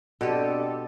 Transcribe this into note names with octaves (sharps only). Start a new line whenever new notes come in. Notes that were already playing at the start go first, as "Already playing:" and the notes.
B2 C4 D4 G4 A4 D5